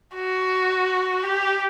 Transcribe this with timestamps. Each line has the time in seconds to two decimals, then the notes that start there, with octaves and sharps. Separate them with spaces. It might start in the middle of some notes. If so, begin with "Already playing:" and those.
0.15 F#4
1.23 G4